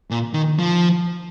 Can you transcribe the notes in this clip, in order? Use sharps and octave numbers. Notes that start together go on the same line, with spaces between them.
A#2
D#3
F3